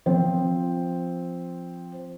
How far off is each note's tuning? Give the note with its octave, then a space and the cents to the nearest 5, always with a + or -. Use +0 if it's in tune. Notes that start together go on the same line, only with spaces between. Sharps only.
F3 +0 C4 +0